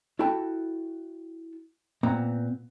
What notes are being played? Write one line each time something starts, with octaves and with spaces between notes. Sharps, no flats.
E4 F#4 A4 G5 A5
A#2 B3 C4 A#5